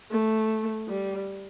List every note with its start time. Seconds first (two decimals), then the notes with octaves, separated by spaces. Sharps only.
0.11 A3
0.89 G3